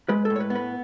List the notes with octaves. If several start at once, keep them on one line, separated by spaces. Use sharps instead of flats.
G#3 B4
A2 A4
C#5
B4
B3
B4